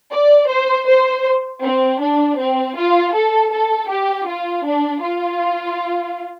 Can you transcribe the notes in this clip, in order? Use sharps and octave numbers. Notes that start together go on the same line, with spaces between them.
D5
C5
C5
C4
D4
C4
F4
A4
A4
G4
F4
D4
F4